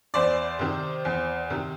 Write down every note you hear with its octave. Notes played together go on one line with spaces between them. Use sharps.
E2 C5 D5
C3 D#3
E2
C3 D#3